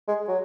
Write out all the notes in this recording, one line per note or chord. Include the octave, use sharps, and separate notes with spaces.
G#3
F#3